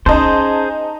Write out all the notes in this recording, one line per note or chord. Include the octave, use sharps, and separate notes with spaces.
C#4 D#4 G#4 C5 A5